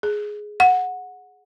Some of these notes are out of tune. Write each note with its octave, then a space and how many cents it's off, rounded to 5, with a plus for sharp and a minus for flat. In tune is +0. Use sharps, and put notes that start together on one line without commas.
G#4 +10
F#5 -15